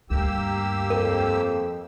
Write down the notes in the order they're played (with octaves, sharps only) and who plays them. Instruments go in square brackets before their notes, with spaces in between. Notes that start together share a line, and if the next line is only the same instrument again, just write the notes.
[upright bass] D2 G2 [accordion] A#3 G4 E6
[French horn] F2 [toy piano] A#4